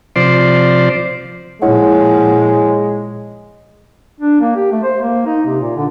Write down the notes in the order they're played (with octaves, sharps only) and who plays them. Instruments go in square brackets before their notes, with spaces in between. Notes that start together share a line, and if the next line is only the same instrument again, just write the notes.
[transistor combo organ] C3 F3 C5 D5
[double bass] A#2 F3 [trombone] G#3 [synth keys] E4 C#5 F#5
[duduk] D4
A#3
G4
A3
C5
A#3
D#4
C3
A#2
D3